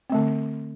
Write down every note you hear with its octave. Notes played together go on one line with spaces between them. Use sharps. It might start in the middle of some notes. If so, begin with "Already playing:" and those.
D3 A3 C4